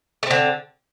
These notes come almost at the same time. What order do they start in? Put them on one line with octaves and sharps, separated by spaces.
A3 C4 D3